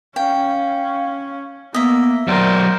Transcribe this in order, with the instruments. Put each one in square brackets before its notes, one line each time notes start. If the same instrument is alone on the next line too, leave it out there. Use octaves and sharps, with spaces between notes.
[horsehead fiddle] C#4 [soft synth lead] F5 [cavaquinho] G5
[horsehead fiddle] A#3 [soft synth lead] B3 [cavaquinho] D#5 E5
[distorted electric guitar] F#3 D5 [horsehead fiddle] A#4 C5 [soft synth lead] C6